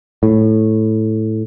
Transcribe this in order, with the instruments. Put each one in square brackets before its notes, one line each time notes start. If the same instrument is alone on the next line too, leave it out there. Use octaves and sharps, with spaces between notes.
[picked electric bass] A2